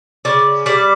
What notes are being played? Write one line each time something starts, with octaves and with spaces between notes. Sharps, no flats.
C#3 D5
G3 D5